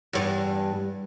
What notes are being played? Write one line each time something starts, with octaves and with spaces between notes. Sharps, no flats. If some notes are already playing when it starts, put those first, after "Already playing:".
E2 G2